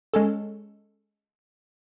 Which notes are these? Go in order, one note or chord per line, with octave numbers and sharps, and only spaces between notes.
G#3 C#4 A4